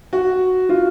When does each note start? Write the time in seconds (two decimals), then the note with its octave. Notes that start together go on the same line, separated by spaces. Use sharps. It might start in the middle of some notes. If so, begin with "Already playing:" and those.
0.13 F#4
0.69 F4